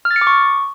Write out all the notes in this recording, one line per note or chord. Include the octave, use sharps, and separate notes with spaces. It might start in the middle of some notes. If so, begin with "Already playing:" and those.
F6
A6
C#7
D6
C#6